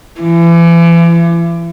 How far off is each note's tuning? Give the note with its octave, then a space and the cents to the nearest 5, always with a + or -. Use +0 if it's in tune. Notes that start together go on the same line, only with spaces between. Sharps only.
E3 +35